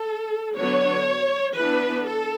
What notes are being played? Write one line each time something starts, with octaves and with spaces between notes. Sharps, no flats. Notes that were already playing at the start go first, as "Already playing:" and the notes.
Already playing: A4
D3 F#3 B3 D4 C#5
E3 B3 D4 B4
A4